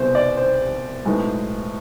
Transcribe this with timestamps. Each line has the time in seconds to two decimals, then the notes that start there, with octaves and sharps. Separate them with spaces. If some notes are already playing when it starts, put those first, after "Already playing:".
Already playing: C2 B2 B3 C5
0.15 D5
0.37 C5
1.05 B1 A2 G#3 B3